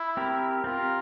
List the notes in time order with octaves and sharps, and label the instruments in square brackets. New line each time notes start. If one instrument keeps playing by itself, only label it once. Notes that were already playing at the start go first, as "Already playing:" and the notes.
Already playing: [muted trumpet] E4
[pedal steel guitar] C4 G4 A#4
[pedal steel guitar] C4 G4 A#4 [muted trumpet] F4